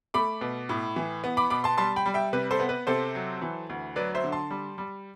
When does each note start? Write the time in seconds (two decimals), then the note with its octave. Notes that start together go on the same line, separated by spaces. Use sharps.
0.14 A3 B5 D6
0.41 B2
0.69 A2
0.96 E3
1.24 B3
1.37 B5 D6
1.50 B2 B5 D6
1.64 A5 C6
1.78 G3 A5 C6
1.96 G5 B5
2.06 G3
2.14 E5 G5
2.33 C3 B4
2.51 A4 C5
2.60 B3
2.69 B4
2.87 C3 A4 C5
3.15 F#3
3.42 E3
3.70 D2
3.96 F#3 B4 D5
4.14 C5 E5
4.24 D3
4.32 A5 C6
4.51 G3
4.78 G3